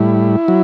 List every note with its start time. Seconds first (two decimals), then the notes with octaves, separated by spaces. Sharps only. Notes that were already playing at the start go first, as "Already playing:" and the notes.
Already playing: A2 G3 E4
0.48 F#3